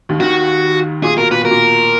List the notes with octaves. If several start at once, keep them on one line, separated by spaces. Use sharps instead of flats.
D#2 D#3
D#2 D#3 F#4
A#2 G#4
B2 A#4
A#2 B4
B2 A#4
A#2